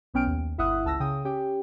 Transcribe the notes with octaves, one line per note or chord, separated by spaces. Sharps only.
B1 B3 C#4 G5 F6 D7
D#2
G1 E4 E5 F#5 D#6 F#6
C#2 A5 E6 A#6
C#3 G5 D#6
C#4 G4 G5